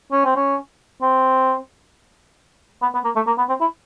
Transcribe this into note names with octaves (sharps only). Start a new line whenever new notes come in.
C#4
C4
C#4
C4
B3
B3
A#3
A3
A#3
B3
C4
E4